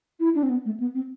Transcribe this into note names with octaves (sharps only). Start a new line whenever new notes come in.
E4
D4
C4
B3
A3
B3
C4